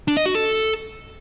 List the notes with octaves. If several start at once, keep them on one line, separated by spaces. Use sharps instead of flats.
D4
D#5
F#4
A4